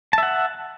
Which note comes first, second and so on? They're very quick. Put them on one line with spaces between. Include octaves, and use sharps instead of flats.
A5 E5 F#5